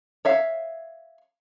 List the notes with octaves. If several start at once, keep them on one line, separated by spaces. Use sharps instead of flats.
C#5 E5 F5